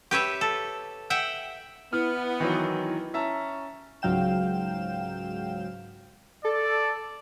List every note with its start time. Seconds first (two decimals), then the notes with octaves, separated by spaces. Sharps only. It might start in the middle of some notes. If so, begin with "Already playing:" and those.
0.11 G4 B4 C#5 E5
0.41 A4
1.10 E5 F#5 G5
1.93 B3 E4 F6
2.40 D#3 E3 F#3
3.14 C#4 E5 A5 A#5
4.02 C#2 G#2 F#3 F5 G5 E7
6.45 A4 D5